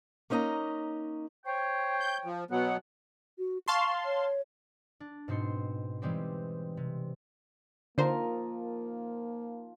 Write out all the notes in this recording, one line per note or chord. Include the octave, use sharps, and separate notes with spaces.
A#3 C#4 D#4 D#5 A#5
C5 C#5 G5
G6
F3
B2 F#3 B3 F#5
F#4
F5 A5 C6 C#6
C#5
D4
G#2 B2 C4 C6 C#7
E3 G3 G#3 C4 G4
C3
D3 F3 A#3 D#4 A#4 C5 D#6